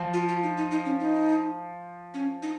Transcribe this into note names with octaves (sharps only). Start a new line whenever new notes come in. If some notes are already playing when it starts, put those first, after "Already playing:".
Already playing: F3
F4
F4
D#4
D#4
D#4
C#4
D#4
C#4
D#4